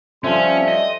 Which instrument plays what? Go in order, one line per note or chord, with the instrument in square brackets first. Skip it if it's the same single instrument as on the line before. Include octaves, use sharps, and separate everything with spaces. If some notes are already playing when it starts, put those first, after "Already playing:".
[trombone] F3 [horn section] G3 A3 C6 [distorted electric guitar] C#4
[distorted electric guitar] D#5